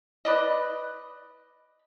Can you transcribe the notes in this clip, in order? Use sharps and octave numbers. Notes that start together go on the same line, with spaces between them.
B4 D5 D#5